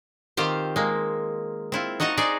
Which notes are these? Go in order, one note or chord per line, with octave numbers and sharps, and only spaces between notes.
D#3 C4 F4 G4 C5
G#3 A#3
C4 E4 F4
D#4 F#4 D#5 A5 A#5
D#4 G#4 C5 D5